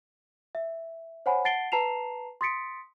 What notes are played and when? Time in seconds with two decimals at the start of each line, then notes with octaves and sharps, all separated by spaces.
0.55 E5
1.26 C5 C#5 F#5 G#5 B5
1.45 F#5 A5 A6 C7 D7 G7
1.72 B4 A5 A#5 C7 E7 F7
2.41 C6 D#6 A6 B6 C#7 D7